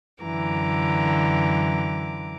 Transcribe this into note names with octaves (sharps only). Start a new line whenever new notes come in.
F#2 D3 E3 A#5 D6